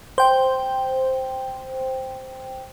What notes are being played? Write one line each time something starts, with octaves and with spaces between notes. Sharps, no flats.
C5 G5